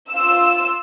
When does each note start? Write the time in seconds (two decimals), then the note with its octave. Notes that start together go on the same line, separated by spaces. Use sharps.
0.11 F4 E6